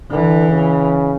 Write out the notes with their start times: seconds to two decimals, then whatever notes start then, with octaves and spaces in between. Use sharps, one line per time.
0.11 D3 E3
0.50 C#3